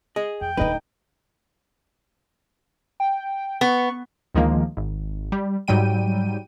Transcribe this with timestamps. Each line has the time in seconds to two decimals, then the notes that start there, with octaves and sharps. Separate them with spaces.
0.16 G#4 D#5
0.41 F2 G5
0.57 D1 D3 D#4 B4 D#5
3.00 G5
3.61 B3 C#6
4.35 D2 D#3 F3 G#3 A#3
4.77 G#1
5.32 G3
5.68 G#2 F#3 G3 G5 D#7